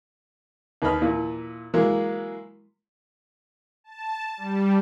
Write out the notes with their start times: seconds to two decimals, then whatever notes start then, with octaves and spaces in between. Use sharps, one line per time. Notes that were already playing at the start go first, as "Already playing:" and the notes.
0.82 D#2 B4 D#5 B5 F6
1.02 A#2 E3
1.74 E3 F#3 G#3 A#3
3.84 A5
4.37 G3